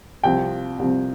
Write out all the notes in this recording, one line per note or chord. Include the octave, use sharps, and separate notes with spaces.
C2 C3 F3 G5
C2 C3 F3